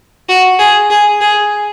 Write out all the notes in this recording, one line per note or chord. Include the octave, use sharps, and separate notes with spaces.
F#4
G#4
G#4
G#4